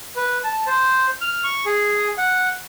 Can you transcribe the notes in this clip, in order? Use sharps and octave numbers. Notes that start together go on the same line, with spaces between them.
B4
A5
C5
F6
C#6
G#4
F#5